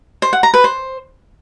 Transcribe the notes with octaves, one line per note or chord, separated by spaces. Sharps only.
C5
F#5
A#5
B4
C5